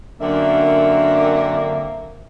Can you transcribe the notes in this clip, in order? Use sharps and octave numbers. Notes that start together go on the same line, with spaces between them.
F#2 D3 A#3 C4 D4 E5